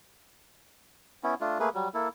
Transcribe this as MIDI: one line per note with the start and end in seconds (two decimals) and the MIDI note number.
1.23 1.34 59
1.23 1.34 61
1.23 1.34 64
1.41 1.58 57
1.41 1.58 62
1.41 1.58 65
1.60 1.69 57
1.60 1.69 58
1.60 1.69 68
1.60 1.69 71
1.74 1.89 54
1.74 1.89 55
1.94 2.08 58
1.94 2.08 64
1.94 2.08 69